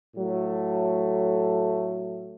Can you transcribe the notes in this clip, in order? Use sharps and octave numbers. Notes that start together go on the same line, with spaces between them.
A2 F#3 A3